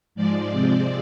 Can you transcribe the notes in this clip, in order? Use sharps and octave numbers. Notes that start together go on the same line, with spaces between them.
G#2 F3 G#3 D5
C3 F3 G#3 C4